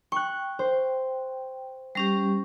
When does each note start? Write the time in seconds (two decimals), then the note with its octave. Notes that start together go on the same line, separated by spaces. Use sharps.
0.12 G5 C#6 F#6
0.59 C5
1.95 G3 C#4 G4 A#6